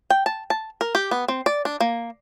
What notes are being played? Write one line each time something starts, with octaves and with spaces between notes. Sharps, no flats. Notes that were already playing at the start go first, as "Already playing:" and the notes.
G5
A5
A5
A#4
G4
B3
C4
D5
D4
A#3